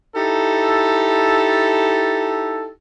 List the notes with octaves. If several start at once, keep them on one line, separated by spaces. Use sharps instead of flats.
D#4 E4 G4 A4